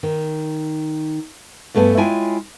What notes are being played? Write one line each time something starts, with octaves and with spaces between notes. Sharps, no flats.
D#3
G2 A3 B3 G4 F#5 G#5
G#3 E4 F4 C#5 G5 G#5